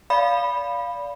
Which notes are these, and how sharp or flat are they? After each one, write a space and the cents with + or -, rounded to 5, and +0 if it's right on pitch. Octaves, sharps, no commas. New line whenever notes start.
D5 -25 F5 +0 B5 +0